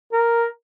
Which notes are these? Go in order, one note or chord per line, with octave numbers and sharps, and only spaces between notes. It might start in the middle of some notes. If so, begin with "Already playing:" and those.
A#4